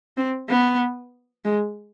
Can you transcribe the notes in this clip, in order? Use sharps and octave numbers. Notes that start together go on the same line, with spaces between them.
C4
B3
G#3